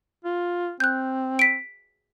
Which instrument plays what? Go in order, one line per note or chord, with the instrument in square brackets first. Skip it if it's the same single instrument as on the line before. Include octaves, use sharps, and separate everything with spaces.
[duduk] F4
[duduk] C4 [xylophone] F#6 G6
[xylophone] B6 D7